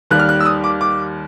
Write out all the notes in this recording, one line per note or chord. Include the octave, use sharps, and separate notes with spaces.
D#2 D#3 G3 F#6
F6
F#6
E6
D#6
D6
D6